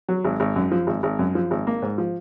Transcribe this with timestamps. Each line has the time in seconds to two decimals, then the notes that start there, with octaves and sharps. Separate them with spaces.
0.09 F#3
0.24 G#1
0.40 G#1
0.56 F#2
0.72 F3
0.87 G#1
1.03 G#1
1.19 F#2
1.35 F3
1.51 G#1
1.67 A#3
1.82 G#2
1.98 F3